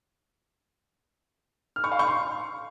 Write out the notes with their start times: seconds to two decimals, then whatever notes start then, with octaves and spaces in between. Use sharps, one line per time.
1.76 F6
1.84 C#6
1.92 F5
1.99 C#6
2.07 C6